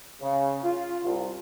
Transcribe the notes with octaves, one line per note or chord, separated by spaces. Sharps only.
C#3
F4
C2